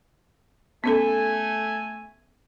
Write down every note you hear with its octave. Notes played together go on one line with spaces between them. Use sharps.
A3 B3 C#4 A4 G#5